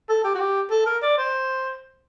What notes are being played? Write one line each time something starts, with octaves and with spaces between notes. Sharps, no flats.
A4
G4
F#4
G4
A4
A#4
D5
C5